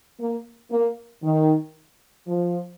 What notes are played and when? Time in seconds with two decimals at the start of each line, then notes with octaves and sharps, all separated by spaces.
0.20 A#3
0.71 A#3
1.23 D#3
2.27 F3